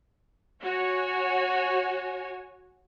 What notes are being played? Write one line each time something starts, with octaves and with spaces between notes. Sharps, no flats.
F#4 C#5 G#5